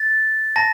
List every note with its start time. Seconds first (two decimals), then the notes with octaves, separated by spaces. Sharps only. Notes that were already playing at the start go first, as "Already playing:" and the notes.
Already playing: A6
0.56 A5 A#6